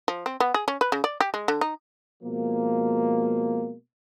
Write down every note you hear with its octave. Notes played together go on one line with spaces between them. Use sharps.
F3
C4
B3
G#4
C#4
B4
C#3
D5
G4
G#3
D3
D#4
B2 F3 G#3 A#3